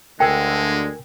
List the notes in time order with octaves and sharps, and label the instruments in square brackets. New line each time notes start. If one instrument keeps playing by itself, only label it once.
[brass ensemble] D2 D3 [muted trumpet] G#3 [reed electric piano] A#4 G#5 E6 [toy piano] G5